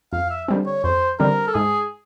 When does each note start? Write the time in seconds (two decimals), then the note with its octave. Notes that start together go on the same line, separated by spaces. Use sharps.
0.13 F2 F5
0.30 E5
0.48 D3 G3 C4
0.66 C#5
0.84 F2 C5
1.20 D3 G3 C4 A#4
1.48 A4
1.55 G#2 G#4